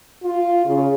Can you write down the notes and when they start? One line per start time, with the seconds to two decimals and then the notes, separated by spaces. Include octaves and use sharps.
0.23 F4
0.65 C#3